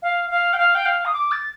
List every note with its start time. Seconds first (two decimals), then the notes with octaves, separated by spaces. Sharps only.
0.02 F5
0.30 F5
0.53 G5
0.58 F5
0.75 G5
0.86 F5
1.05 D#6
1.13 D6
1.32 A6